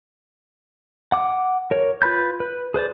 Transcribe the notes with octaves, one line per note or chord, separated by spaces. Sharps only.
F#5 D6
A#4 C#5
F4 B4 B5 G6
B4
G#4 B4 C5 D5